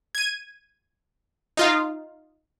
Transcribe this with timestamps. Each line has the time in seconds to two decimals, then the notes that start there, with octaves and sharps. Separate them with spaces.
0.15 G#6 D#7
1.57 D#4 F4 F5